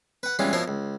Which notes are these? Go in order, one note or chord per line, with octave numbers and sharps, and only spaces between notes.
B4 F#5
E3 G3 G#3 C#4 F4
B2 F3 E4 A#4 C#5 C6
C#2